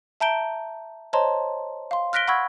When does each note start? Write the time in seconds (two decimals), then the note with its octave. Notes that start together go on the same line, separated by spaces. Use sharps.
0.20 E5 A5 A#5 G6 D7 G7
1.13 C5 C#5 D#5 A5 A#5 C6
1.91 F5 C6
2.13 F6 F#6 A#6 B6 D7 G7
2.28 F#5 B5 C#6 E6 G#6